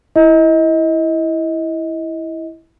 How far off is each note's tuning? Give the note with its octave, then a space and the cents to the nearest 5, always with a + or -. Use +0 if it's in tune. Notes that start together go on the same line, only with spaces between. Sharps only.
E4 +0 D#5 +25